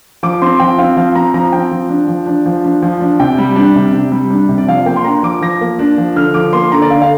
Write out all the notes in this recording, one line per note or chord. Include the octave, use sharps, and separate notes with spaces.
F3 D6
C4 C6
F3 G5
C4 F5
F3 F5
C4 A#5
F3 A#5
C4 G5
F3
D4
F3
D4
F3
D4
F3
D4
C3 G5
G3
D4
C3
C3
G3
D4
C3
D5
F3 F5
A#3 G5
C6
D4 A#5
F3 D6
F3 A#6
A#3
D4
F3
D3 F6
F3 D6
A#3 C6
D3 A#5
D5
D3 F5
F5